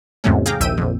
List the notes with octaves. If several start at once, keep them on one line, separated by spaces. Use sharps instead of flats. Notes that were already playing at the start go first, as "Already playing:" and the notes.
E2 G#2 C3 F#3 A3 C#4
G#4 F5 G5 A#5 D6
A#1 D#2 E5 G5 E6 D#7
A#1 F2